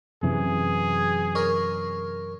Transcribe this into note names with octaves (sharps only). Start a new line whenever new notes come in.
F#2 C3 E3 G#4
A#4 C#5